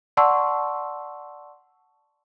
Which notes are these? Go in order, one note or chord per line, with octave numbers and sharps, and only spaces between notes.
D5 F#5 A5 C6 C#6 E6